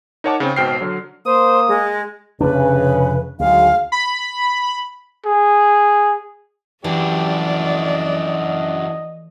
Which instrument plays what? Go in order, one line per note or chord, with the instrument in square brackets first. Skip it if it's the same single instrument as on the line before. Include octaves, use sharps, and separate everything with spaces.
[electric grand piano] D#4 A#4 C#5 F#5 A5 D6
C#3 C4
G#1 B2 C5 G5 F6 C7
D3 F#3
[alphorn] A#3 [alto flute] C5 [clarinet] D#6
[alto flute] G#3
[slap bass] F1 F3 D4 [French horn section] C#3 [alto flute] B4
[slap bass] D2 [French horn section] D#3 F#3 G#3 [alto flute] F5
[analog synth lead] B5
[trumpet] G#4
[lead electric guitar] F#2 D4 [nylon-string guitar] E3 [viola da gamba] F3 A3 D5 [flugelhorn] G4
[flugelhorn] D#5